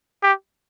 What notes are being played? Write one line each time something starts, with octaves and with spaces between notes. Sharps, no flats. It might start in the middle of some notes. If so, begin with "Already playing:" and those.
G4